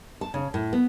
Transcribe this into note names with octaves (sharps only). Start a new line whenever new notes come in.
A5
C#3
A2
B3